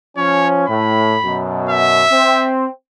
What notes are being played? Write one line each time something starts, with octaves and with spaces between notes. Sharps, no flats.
F3 C#4 C#5
A2 B5
F#2 B2
E5
C4